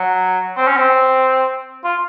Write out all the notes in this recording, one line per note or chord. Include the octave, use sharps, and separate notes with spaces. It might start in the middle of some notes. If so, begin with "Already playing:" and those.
Already playing: F#3
C4
C#4
C4
F4